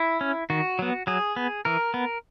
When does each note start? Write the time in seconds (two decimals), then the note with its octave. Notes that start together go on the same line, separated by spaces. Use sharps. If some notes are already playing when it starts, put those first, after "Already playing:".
Already playing: E4
0.21 C#4
0.50 D#3 F#4
0.79 F#3 B3
1.07 F#3 G#4
1.36 B3
1.65 E3 A#4
1.94 B3